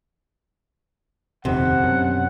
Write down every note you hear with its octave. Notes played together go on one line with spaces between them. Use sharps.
D#1 F2 C3 D#3 F#5
F#2 B2